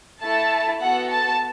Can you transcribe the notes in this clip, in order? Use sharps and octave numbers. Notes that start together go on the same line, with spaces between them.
A3 E4 A4 A5
B3 F#4 A4 F#5
A5